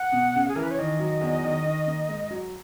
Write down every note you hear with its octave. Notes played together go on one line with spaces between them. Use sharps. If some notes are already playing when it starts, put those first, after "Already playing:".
Already playing: F#5
B2
C#3
G#4
E3 A#4
B4
C#5
D#3 D#5
F#3
E2
D#3
D#3
A#3
G#2
F#3